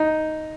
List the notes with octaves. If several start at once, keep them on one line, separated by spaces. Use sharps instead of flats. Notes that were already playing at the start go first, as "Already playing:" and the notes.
Already playing: D#4